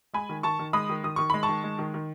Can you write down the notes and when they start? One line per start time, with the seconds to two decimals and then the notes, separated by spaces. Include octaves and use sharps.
0.13 G#3 G#5 B5
0.29 D#3
0.43 D#3 A5 C#6
0.59 D#3
0.73 G#3 B5 D#6
0.89 D#3
1.04 D#3 D#6
1.16 D#3 C#6
1.30 G#3 B5
1.43 A5 C#6
1.49 D#3
1.64 G#3
1.79 D#3
1.94 D#3